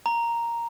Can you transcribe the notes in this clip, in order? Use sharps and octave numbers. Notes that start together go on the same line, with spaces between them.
A#5